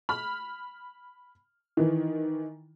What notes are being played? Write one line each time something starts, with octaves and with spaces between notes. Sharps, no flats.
B5 F6
D#3 E3